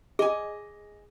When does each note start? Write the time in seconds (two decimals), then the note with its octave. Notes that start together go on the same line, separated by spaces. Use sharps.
0.19 G#4 D#5 G#5